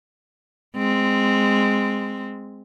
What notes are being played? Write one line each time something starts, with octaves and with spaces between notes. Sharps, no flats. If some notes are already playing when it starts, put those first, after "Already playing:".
G#3 C4